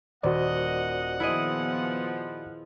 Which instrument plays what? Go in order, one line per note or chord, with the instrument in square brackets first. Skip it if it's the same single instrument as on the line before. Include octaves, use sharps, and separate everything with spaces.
[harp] D#1 [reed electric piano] F#4 C5 D5 [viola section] D#5 [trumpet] F#5
[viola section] F3 B3 [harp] E4 G#4 D#5